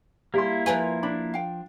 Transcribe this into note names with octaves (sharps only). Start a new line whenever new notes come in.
G3 A#3 E4 C6
F3 A#4 B4 E5 G#5
D4 B5
F5 G5